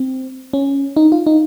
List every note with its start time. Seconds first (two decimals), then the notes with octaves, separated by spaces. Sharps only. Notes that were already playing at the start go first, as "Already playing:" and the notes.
Already playing: C4
0.53 C#4
0.96 D#4
1.12 F4
1.27 D#4